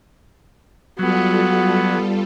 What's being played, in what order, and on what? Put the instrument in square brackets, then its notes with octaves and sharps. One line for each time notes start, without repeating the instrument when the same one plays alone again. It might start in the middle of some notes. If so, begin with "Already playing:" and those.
[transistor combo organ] F#3 [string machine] G3 F4 A4 [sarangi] B3 [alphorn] F#4